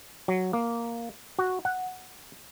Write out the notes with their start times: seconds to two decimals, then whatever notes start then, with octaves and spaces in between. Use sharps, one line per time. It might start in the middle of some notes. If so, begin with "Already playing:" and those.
0.28 F#3
0.53 A#3
1.39 F#4
1.65 F#5